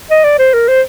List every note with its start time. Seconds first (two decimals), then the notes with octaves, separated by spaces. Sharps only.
0.10 D#5
0.24 D5
0.39 C5
0.54 A#4
0.68 C5